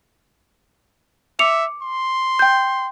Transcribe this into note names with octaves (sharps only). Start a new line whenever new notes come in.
E5 D6 C#7 F7
C6
G5 G6